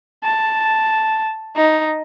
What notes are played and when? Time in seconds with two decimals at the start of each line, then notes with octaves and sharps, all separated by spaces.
0.24 A5
1.56 D#4